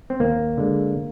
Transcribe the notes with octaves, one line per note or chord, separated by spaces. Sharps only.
C4
D#2 A#3
D3 G#3